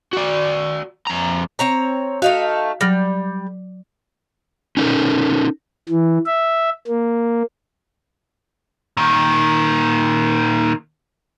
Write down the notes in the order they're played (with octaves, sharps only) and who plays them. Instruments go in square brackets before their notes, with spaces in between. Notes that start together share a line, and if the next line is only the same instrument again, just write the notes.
[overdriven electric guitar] F#4 D5
F2 A#5
[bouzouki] C4 C#5 A#5
[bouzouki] A3 D#4 F5 [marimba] F#4
[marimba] F#3 F6 A#6 [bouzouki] G3
[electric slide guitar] C#4 D#4 A4 A#4
[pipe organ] E3
E5
A#3
[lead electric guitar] A#2 D#3